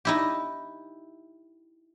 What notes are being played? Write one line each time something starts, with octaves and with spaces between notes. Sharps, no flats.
D#4 E4 G4